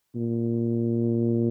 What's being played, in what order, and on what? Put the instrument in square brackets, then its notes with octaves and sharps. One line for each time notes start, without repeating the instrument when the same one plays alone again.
[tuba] A#2